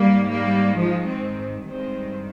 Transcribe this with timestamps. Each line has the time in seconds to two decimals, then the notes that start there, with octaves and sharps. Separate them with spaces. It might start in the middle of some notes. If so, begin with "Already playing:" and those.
Already playing: G#2 D#3 G3 A#3
0.30 G3 A#3
0.76 F3 G#3
1.07 G#3 C4
1.69 G2 D#3 G#3 C4